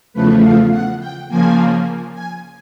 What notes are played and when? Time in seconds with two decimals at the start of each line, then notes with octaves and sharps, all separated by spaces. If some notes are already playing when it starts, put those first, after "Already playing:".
0.14 E2 C#3 F3 A3 B4
0.42 F5
0.71 F#5
1.00 G5
1.29 C#3 F3 A#3 G#5
2.15 G#5